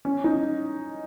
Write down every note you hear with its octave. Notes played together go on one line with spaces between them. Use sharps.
C#4
D#4